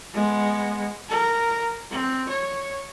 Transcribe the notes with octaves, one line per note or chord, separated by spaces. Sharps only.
G#3 B3
A#4
C4
C#5